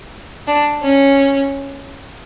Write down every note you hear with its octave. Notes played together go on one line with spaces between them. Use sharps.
D4
C#4